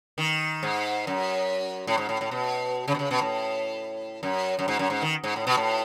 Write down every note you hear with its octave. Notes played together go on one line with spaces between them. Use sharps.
D#3
G#2
F#2
A2
G#2
A2
A2
B2
C#3
B2
C#3
B2
A2
F#2
F#2
G#2
F#2
G#2
D#3
G#2
A2
B2
A2